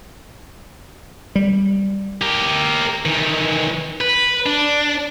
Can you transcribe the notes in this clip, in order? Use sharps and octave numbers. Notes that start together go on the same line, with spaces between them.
G3
G4 A#4
D#3 E3
B4
D4